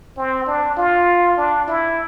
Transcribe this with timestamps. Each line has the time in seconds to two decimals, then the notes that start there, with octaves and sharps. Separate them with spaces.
0.17 C4
0.46 D4
0.77 F4
1.37 D4
1.68 E4